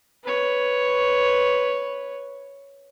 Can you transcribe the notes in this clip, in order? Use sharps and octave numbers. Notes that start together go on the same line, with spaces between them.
B4 C#5